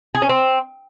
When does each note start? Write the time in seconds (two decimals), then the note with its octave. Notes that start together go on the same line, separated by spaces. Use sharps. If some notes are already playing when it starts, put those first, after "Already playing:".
0.15 G#4
0.22 C#4
0.29 C4